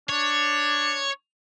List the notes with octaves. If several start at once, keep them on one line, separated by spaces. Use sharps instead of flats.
D4 C#5